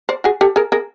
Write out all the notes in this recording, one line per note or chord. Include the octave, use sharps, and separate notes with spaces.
C5 D5
F#4 G#4
G4 A4
G#4 A#4
G#4 A#4